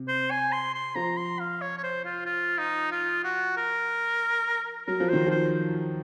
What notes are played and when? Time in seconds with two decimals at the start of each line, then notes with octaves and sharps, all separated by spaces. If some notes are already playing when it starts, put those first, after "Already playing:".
Already playing: C3
0.08 C5
0.31 G#5
0.52 C6
0.75 C6
0.95 F3 A#5
1.17 C6
1.40 F5
1.62 C#5
1.78 C#5
1.83 C5
2.05 F4
2.26 F4
2.58 D#4
2.92 F4
3.24 F#4
3.57 A#4
4.87 F#3 A#4
5.00 F3
5.09 D#3 C5
5.26 F3 C5